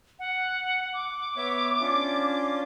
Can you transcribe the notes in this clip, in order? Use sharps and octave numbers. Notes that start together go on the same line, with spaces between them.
F#5
D6
B3 C#5 E5
C#4 D4 F4